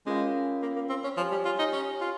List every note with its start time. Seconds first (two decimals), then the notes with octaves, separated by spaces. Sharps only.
0.06 G#3 C#4 F4 A#4 F5
0.62 A#3
0.76 A#3
0.89 C4
1.04 C#4
1.17 F3 G4 C#5 G#5
1.31 G3
1.45 F4
1.59 D#4
1.73 C#4
2.01 F4